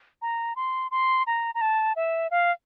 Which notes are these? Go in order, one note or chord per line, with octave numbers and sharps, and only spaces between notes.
A#5
C6
C6
A#5
A#5
A5
E5
F5